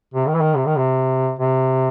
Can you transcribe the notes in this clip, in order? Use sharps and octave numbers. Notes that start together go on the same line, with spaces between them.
C3
D#3
E3
D#3
C3
D#3
C3
C3